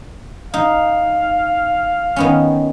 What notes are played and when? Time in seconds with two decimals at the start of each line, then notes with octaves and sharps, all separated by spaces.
0.54 D#4 F5
2.16 D#3 B3 C#4